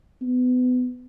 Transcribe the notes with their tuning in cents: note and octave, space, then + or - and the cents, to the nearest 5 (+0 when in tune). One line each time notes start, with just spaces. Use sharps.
B3 +25